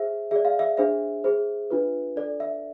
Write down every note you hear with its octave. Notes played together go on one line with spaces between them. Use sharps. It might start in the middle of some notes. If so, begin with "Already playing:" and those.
Already playing: G#4 C5 E5
G#4 D5 E5
F5
E5
D4 G#4 C5 E5
G#4 C5
D4 F4 B4
D4 A4 D5
E5